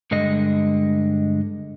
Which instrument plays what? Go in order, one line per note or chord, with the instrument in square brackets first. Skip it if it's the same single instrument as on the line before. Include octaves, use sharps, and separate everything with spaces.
[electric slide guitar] G2 D3 G#3 D#5